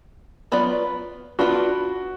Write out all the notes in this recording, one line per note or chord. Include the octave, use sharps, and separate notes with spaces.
F#3 B3 F4 B4 D5
B3 D4 F4 F#4 B4